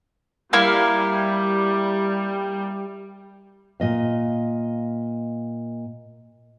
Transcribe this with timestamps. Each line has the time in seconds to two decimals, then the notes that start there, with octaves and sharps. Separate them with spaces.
0.53 G3 A#3 E4 F5
3.80 A#2 D#5 F5